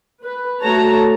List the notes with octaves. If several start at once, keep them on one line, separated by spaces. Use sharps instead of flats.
B4
A3 F#4 C#5 A5 A#5